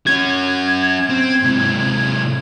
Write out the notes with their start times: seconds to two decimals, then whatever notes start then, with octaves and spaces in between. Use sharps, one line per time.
0.07 C#4 F#4 G#6
1.09 C4
1.43 G#2 C3